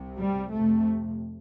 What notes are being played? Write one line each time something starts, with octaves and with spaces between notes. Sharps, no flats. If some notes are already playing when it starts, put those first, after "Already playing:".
Already playing: C2 C3
G3
F2 C3 A3